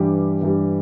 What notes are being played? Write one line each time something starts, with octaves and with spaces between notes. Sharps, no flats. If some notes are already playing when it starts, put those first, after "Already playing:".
Already playing: G2 E3 G3 G4
G2 E3 G3